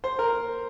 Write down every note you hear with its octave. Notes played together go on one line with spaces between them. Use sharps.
C5
A#4